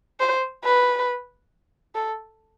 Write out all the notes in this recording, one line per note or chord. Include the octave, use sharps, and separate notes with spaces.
C5
B4
A4